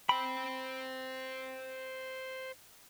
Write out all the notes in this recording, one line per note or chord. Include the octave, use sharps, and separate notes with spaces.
C5 G5 B5